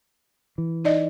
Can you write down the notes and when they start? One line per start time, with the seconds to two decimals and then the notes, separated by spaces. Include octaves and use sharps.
0.58 E3
0.84 D#4 D5 D#5